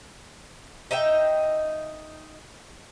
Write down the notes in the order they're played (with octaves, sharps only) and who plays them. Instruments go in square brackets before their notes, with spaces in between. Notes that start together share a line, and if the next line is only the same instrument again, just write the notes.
[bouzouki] D#4 D#5 E5 G5